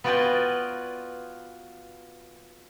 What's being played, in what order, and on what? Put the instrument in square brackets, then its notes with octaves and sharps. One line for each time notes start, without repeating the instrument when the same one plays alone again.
[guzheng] B3 F4 F#4 D5 G5 G#5